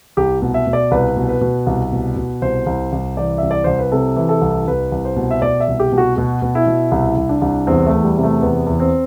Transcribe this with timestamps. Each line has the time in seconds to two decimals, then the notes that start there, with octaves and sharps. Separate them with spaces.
0.17 C2 G4
0.42 B2
0.54 E5
0.67 B2
0.73 D5
0.91 C2 B4
1.17 B2
1.29 B4
1.41 B2
1.66 C2
1.92 B2
2.16 B2
2.41 C2 C5
2.66 C2
2.92 C2
3.16 E3 D5
3.38 C2 E5
3.51 D5
3.64 C2 C5
3.79 B4
3.92 C3 A4
4.16 E3
4.29 A4
4.41 C2
4.68 C2 B4
4.92 C2
5.05 C5
5.16 B2
5.31 E5
5.42 B2 D5
5.60 E5
5.68 C2
5.80 G4
5.92 B2
5.98 F#4
6.16 B2 F#4
6.42 B2
6.55 E4
6.66 B2
6.91 C2 E4
7.16 C2
7.29 D4
7.42 C2
7.67 E2 C4
7.86 A3
7.92 E2
8.04 G3
8.18 C3
8.23 A3
8.42 E2 B3
8.67 E2
8.80 C4